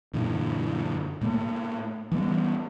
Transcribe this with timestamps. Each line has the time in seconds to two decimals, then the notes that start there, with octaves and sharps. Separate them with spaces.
0.14 F#2 A#2 D3 E3
1.21 A2 A3 A#3
2.12 E3 G3 B3